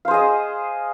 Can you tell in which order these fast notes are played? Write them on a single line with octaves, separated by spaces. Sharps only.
F5 C5 G#4 D#5